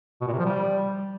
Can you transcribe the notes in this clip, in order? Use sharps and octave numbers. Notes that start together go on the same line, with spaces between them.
B2
A#2
C3
F3
G3